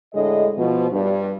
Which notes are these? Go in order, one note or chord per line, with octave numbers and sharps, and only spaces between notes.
A2 D3 G#3 D#5
B2 F3
G2